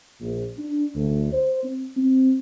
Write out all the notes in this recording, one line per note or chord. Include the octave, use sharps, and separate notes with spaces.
A#1
D4
D2
C5
C4
C4